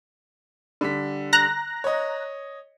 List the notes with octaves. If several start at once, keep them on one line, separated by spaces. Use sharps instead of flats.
D3 G3 B6
A#5 F#6 A#6
C#5 D#5